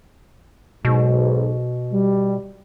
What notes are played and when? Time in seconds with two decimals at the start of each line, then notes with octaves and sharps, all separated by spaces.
0.85 B1 G#2 B2
1.93 G3